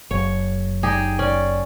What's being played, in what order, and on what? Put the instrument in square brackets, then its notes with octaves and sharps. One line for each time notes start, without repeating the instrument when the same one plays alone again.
[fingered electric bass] F#1 [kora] C#5
[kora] D#4 G4 G#4
C#4 D5